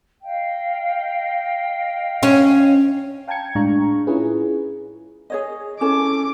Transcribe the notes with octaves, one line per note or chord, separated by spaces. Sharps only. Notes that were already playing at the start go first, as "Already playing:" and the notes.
D#5 F5 G5
C#4 C#5
F5 G5 A5 A#5 G#6 C#7
A2 G#3 D4 F5 A#5 C#6
C#4 E4 F4 G#4 B4
G#4 C#5 D#5
C#4 E4 A4 D6